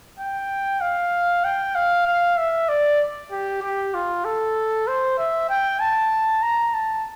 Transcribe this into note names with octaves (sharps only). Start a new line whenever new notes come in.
G5
F5
G5
F5
F5
E5
D5
G4
G4
F4
A4
C5
E5
G5
A5
A#5
A5